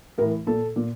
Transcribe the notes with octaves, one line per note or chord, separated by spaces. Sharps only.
A2 E3 A#4
A#2 A4
A#2